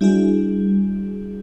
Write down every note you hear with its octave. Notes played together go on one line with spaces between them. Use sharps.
G3 D4 E4 F#4 G#4